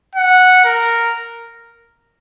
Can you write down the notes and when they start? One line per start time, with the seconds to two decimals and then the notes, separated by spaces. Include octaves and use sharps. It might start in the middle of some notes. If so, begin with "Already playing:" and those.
0.15 F#5
0.64 A#4